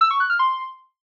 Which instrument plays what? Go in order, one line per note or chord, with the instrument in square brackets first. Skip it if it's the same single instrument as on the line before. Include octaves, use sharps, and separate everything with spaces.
[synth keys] E6
C#6
F#6
F6
C6